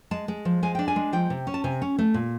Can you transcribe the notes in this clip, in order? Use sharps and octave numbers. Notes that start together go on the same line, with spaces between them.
G#3 A5
G#3
F3
G#3 G#5
D4 G5
G#5
G#3
F3 G5
C3
C#4
A5
C3 G#5
C#4
A3
A#2